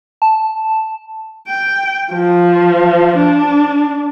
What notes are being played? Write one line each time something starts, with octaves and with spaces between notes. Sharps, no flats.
A5
G5
F3
D4